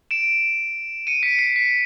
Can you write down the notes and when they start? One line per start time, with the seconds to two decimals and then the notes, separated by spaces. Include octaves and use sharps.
0.11 D7 E7
1.07 C#7 D#7
1.23 B6 C#7
1.39 C7
1.56 B6